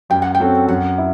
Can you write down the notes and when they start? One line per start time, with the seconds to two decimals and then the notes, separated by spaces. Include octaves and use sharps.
0.10 F#2 G5
0.22 F#5
0.35 G5
0.40 F#3 C4 F#4 A4
0.68 F#2 F#5
0.98 E4